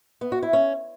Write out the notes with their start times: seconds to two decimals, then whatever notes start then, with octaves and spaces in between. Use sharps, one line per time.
0.21 B3
0.32 F#4
0.43 E4
0.53 C#4